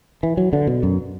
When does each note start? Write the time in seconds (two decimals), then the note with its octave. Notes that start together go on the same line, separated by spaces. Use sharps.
0.23 E3
0.37 F#3
0.53 D3
0.67 B2
0.83 F#2